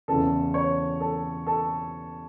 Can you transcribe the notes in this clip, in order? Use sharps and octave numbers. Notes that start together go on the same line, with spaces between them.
E2 C#3 E3 A4
C#5
A4
A4